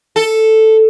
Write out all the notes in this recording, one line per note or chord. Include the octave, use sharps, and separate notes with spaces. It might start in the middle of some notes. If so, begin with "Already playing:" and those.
A4